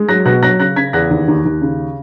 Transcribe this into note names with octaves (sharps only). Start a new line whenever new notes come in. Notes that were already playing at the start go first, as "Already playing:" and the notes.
Already playing: G#3
F#3 F#6 A#6
B2 F#6 A#6
F#3 F#6 A#6
C#3 F#6 A#6
C#3 G#6 B6
E2 F#6 A#6
D#2
D#2
D#2
C#3